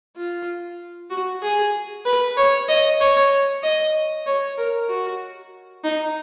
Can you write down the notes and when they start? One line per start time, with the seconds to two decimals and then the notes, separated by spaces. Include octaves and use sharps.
0.16 F4
1.10 F#4
1.43 G#4
2.06 B4
2.37 C#5
2.69 D#5
3.00 C#5
3.63 D#5
4.26 C#5
4.58 A#4
4.89 F#4
5.84 D#4